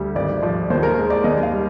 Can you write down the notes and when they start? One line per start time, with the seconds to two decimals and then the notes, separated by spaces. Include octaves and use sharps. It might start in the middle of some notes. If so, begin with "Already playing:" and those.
Already playing: D2 G3
0.15 G#1 D5
0.42 F3 D5
0.70 D#2 C5
0.83 A#4
0.97 G#3
1.10 D5
1.24 D#2 D#5
1.43 F5
1.52 G3